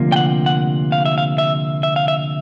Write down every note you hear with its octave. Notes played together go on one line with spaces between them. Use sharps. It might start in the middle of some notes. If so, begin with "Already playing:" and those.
Already playing: D2 C3 F3 A#3
G5
F#5
F#5
F5
E5
F5
E5
E5
F5
E5